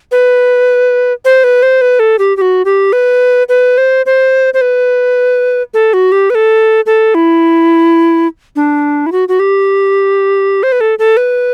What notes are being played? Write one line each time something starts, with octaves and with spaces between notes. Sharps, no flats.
B4
C5
B4
C5
B4
A4
G4
G4
F#4
G4
B4
B4
C5
C5
C5
B4
A4
F#4
G4
B4
A4
A4
E4
D4
E4
F#4
F#4
G4
C5
B4
A4
A4
B4